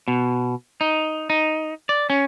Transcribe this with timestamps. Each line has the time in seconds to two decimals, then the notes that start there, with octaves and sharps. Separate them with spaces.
0.08 B2
0.81 D#4
1.30 D#4
1.89 D5
2.10 C#4